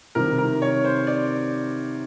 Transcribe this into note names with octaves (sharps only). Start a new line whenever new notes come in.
C3 D#3 G3 C4 A#4
A#4
C#5
C5
D5